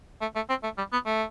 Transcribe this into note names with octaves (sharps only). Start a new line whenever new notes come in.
A3
A3
C4
A3
G3
B3
A3